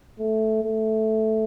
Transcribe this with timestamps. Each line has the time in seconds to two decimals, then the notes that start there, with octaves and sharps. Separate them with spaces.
0.19 A3
0.63 A3